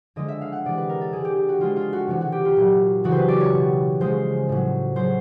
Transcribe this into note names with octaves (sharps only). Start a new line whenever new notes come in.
D3 F3 G#3 D#5
E5
F5
F#5
C3 E3 G#3 D5
B4
A#4
A4
D3 G3 G#4
G4
G4
F#4
D3 F3 G#3 F4
F4
F#4
C3 E3 G3 F#4
F#4
G4
F4
A#2 F#3
C#3 E3 G3 F#4
B4 C5
D5
C#5
B2 G3
C#3 F3 G#3 C5
A2 F#3
C#3 F#3 C5